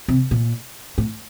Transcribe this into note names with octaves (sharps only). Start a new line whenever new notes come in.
C3
A#2
A2